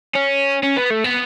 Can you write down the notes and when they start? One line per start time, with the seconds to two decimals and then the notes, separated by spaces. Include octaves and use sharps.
0.16 C#4
0.63 C#4
0.77 B3
0.91 A3
1.04 B3